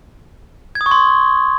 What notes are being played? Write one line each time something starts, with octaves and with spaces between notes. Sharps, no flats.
G#6
D#6
C#6
C6